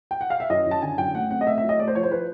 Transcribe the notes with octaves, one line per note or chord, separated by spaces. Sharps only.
G5
F#5
F5
E5
F#2 D#5
F#2 A5
D3 G#5
F#2 G5
A3 F#5
C4 F#5
D#5
A3 E5
E5
F#3
D#5
A3 D5
C5
F3 C#5
C5
F3 B4